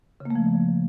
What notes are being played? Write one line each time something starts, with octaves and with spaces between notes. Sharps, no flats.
C#3
A#3
A3
F3